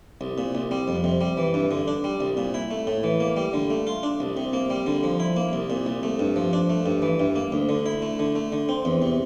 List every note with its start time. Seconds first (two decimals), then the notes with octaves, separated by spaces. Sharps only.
0.21 C2
0.38 A#2
0.55 C2
0.71 G3
0.88 F2
1.04 C3
1.21 G3
1.37 E3
1.54 G2
1.71 D3
1.88 D4
2.04 G3
2.21 C2
2.37 A#2
2.54 E4
2.71 A3
2.87 A2
3.04 E3
3.20 A#3
3.37 G3
3.53 D3
3.70 A3
3.87 F4
4.03 D4
4.20 C2
4.37 C3
4.53 A#3
4.70 G3
4.86 D3
5.03 F3
5.20 E4
5.36 A#3
5.53 C2
5.70 A#2
5.86 C2
6.03 A3
6.19 G2
6.36 F3
6.53 D4
6.70 A3
6.86 G2
7.02 E3
7.20 G2
7.36 A#3
7.52 D2
7.69 D3
7.86 E4
8.02 A3
8.19 D3
8.36 A3
8.52 D3
8.69 C4
8.85 E2
9.02 C3